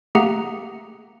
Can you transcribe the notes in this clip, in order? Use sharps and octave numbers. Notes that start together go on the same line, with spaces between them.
A3 A#3 G4 G#4 F#5 A#5